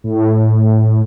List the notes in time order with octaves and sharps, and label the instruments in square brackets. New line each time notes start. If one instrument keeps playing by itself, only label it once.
[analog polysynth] A2